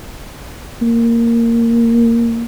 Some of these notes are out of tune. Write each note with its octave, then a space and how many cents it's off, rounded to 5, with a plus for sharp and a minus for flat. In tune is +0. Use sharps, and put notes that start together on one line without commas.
A#3 -5